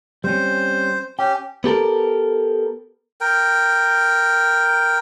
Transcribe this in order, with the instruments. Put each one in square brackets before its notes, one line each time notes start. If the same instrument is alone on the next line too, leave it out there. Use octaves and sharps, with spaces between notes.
[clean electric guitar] G3 C4 C#4 [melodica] C5
[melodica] C#4 G4 [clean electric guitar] G5
[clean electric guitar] B3 G4 A4 A#4
[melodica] A#4 G5